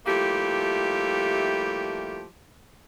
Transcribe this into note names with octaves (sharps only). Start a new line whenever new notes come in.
F3 G3 A3 A#3 E4 G4